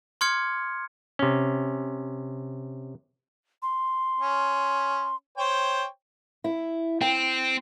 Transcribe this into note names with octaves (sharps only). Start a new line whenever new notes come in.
C6 D6 F6 G#6 C#7
C3 C#4
C6
C#4
C5 C#5 G5
E4
C4 G5